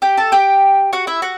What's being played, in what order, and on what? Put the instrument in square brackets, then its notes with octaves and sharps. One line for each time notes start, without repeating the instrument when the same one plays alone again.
[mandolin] G4 G5
A4 A5
G4 G5
F#4 F#5
E4 E5
F#4 F#5